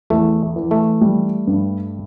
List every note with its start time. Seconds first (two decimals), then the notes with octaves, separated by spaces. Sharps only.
0.10 E2 A3
0.56 E3
0.71 A3
1.01 G3
1.47 G2